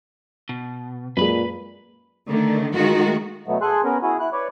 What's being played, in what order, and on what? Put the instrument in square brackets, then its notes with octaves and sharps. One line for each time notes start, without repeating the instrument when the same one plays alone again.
[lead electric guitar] B2
[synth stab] F#2 G#3 [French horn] A#2 [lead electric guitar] B4 B5
[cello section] D3 D#3 A3
D#3 G#3 A3 F4 F#4
[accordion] B2 F#3 A3 B3
G#4 A4 G#5 C6 F#6
B3 C#4 A#4 B4
E4 F#4 G#4
E4 F#6
B4 C#5 D5